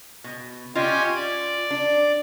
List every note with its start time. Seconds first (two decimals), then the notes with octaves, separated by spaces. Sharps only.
0.24 B2
0.75 C#4 F4 G4 D#5 G#5
1.15 D5
1.71 D4